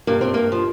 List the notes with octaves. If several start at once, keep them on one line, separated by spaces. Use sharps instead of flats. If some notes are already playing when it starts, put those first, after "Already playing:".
G2 A#3
G2 C4
G2 A#3
F3